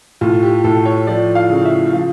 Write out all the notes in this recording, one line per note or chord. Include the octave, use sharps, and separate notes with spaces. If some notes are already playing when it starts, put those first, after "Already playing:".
A2 F4
G4
A2 A4
C#5
F3 D5
F5
C#3
E5
F3 F5